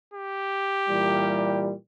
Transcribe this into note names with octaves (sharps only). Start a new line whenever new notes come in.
G4
A#2 E3 G3